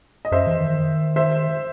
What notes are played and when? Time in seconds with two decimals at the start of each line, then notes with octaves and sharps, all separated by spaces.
0.25 D#5
0.32 F#2 C5 E5
0.47 E3
0.60 D#3
1.16 C5 E5